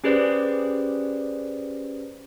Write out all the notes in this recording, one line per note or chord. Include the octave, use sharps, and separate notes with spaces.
C#4 G4 G#4 B4 C5 D5